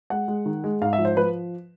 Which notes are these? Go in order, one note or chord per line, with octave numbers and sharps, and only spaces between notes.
G#3 F#5
G#3
D#3
G#3
G#2 F5
E5
F3
C5
F3 B4